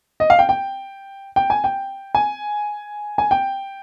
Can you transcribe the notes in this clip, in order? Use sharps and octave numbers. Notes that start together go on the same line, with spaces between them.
D#5
F5
G5
G5
G5
G#5
G5
G#5
G#5
G5